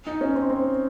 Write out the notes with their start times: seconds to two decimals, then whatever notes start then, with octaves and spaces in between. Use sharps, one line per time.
0.07 D#4
0.21 C#4
0.35 C4
0.50 C4